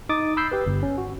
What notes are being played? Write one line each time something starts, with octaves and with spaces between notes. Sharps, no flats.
D#4 D6 D#6 A6
B5 E6 G6 C7
G4 B4
G1
C#4
F#4